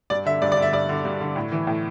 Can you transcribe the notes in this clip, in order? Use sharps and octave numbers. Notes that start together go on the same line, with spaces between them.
G2 D5
D3 E5
G2 D5
D5
D3
E5
G2 D5
D3
G2
D3
A2
E3
A2